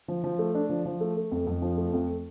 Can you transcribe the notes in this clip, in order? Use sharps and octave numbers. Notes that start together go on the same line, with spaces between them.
F3
F3
A3
D4
F3
F3
A3
A3
F2
F2
F3
A3
F2